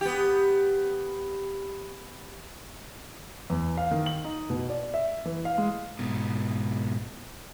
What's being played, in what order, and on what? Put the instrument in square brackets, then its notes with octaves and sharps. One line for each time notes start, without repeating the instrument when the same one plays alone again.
[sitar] B3 G4
[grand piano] E2
F5
D#3
F#7
D#4
B2
D5
E5
E3
F5
G#3
[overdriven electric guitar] G#2 B2